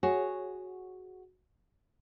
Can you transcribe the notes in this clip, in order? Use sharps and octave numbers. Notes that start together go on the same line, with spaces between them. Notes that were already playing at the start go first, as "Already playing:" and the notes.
F#4 G#4 C#5